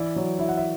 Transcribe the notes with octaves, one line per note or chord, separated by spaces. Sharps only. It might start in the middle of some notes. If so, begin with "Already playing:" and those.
Already playing: E3 E4 D5
F#3
E4 E5
F#5
E5